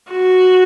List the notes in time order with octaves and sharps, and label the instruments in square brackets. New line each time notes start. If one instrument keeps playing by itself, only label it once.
[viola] F#4